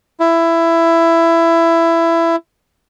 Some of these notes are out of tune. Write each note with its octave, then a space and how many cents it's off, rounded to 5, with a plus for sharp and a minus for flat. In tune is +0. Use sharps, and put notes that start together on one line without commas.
E4 +15